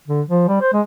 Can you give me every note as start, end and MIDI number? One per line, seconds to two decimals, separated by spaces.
0.07 0.21 50
0.29 0.43 53
0.48 0.60 55
0.61 0.72 72
0.73 0.81 56